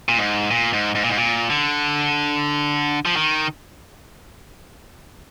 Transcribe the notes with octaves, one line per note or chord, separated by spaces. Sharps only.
A#2
G#2
A#2
G#2
G#2
A#2
G#2
A#2
D3
F3
D#3